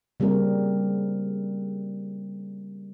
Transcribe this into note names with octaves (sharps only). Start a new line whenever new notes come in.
C#3 G3 A#3 C4 A#4